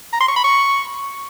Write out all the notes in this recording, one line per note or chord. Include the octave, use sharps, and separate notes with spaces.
A#5
C6
C#6
B5
C#6